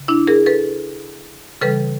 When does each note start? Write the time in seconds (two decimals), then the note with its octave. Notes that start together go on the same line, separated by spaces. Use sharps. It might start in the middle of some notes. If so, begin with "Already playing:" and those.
Already playing: C#3
0.08 D4 E4
0.27 G#4 A#4
0.46 A4 B4
1.61 C#3 E3 G3 A4 B4